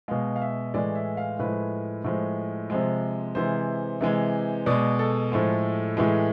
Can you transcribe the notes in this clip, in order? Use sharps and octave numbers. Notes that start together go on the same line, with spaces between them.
B2 G#3 F5
F5
E5
A2 E3 G#3 D5
E5
F5
A2 F3 G#3 B4
A2 F3 G#3
C3 F3 G#3
C3 E3 G#3 C5
C3 E3 G#3
B2 G#3 D5
A4
A2 F3 G#3
A2 E3 G#3 G#4